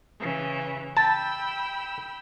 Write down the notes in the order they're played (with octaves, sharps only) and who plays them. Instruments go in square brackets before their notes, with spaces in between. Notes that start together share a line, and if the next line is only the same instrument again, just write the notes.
[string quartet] C#3 E3
[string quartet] G5 B5 E6 [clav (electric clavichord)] A5